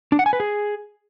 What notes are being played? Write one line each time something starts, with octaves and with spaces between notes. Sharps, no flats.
D4
F#5
G#5
B4
G#4